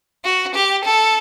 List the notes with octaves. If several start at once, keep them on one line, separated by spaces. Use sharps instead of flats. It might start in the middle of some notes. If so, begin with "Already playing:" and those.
F#4
G4
A4